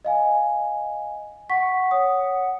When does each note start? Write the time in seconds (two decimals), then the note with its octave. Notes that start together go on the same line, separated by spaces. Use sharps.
0.05 D#5 F5 G#5
1.50 F#5 C#6 B6
1.91 C#5 D#6